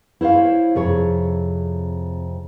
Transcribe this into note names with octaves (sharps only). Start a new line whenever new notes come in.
E4 C5 C#5 F5
F2 C3 G#4 C#5